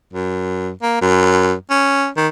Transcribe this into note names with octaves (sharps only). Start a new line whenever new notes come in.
F#2
A#3
F#2
C#4
D#3